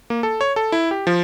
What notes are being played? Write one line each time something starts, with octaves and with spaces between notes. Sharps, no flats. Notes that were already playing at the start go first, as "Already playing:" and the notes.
A#3
A4
C#5
A4
E4
G4
F3